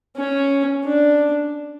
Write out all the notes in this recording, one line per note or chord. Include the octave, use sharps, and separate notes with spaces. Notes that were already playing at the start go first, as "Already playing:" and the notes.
C#4
D4